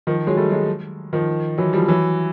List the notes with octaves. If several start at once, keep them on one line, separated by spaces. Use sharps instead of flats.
D#3 F3
F#3 G#3
G3 A3
F#3 G#3
D#3 F3
E3 F#3
F3 G3
E3 F#3